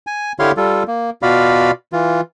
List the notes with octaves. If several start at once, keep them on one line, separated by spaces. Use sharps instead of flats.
G#5
D3 E4 G4 C#5 F5 C6
G3 F4 A4
A#3
B2 F4 F#4 D5 F5 B5
E3 F4